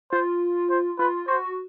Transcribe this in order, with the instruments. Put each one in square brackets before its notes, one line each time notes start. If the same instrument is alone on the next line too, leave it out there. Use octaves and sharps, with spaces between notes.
[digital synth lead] F4 [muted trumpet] C5
[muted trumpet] C5
[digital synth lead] F4 [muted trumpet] B4
[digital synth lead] F#4 [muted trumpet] C5